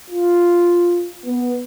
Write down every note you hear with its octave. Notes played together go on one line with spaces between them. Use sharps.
F4
B3